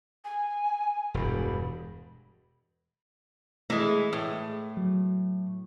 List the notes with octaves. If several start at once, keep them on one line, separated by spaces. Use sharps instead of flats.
G#5
E1 G2 B5
E3 G#3 A3 G#4
A2
F#3